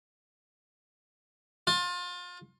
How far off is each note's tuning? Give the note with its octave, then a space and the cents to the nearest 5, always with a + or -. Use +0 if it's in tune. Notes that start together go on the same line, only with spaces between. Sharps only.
F4 +30